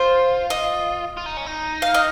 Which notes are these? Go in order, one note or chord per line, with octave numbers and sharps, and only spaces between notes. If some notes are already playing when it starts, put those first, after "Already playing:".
Already playing: F4 C5
D#5
F4
D#4
C#4
D#4
F5
D#5